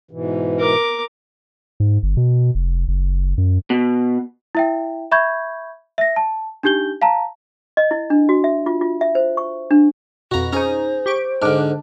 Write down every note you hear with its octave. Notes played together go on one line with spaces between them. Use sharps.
G#2 B2 E3
A#4 D6
G#2
G1
B2
F1
F#1
F#2
B2
E4 E5 G5
E5 B5 C#6 G6 G#6
E5 A#6
A5
D4 D#4 G4 G6 G7
F5 A5 A#5
D#5
E4
D4
F#4
E5
F4
F4
E5
C5
C#6
D4
F2 B2 F#4 A#5
C#4 D#4 G#4 C5 A#5
G4 C#6 D7
G#2 D3 D4 F6